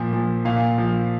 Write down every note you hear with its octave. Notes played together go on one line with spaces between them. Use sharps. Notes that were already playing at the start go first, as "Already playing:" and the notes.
Already playing: A#2 F3
F3
A#2 F5
F3